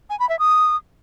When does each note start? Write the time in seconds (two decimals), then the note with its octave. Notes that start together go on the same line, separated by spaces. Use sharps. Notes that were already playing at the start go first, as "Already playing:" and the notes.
0.10 G#5
0.20 B5
0.29 E5
0.39 D#6